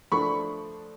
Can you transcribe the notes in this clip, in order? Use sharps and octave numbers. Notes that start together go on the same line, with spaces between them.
F3 A3 D4 B5 C#6